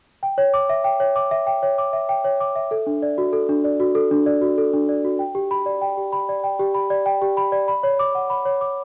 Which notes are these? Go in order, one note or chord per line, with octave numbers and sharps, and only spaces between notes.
G5
C#5
D6
E5
G5
C#5
D6
E5
G5
C#5
D6
E5
G5
C#5
D6
E5
A4
D4
D5
F#4
A4
D4
D5
F#4
A4
D4
D5
F#4
A4
D4
D5
F#4
G5
G4
B5
D5
G5
G4
B5
D5
G5
G4
B5
D5
G5
G4
B5
D5
B5
C#5
D6
F#5
B5
C#5
D6